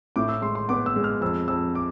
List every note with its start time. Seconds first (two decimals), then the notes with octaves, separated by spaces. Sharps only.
0.16 A2 D6
0.29 E6
0.42 G#3 C6
0.55 C6
0.69 B3 D6
0.86 E6
0.96 G#3
1.04 F6
1.21 F2 E6
1.48 F2 E6
1.75 D6